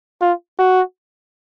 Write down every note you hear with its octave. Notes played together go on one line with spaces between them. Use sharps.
F4
F#4